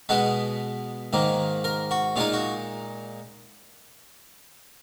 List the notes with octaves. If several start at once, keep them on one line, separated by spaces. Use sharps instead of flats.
B2 G#3 B3 B4
G#2 D#3 A#3
A#4
F#4
A#2 G#3 D#4 F4
F#4